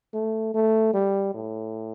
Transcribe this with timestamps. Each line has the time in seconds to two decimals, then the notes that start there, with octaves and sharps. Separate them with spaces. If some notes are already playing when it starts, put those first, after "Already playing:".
0.14 A3
0.54 A3
0.94 G3
1.34 A2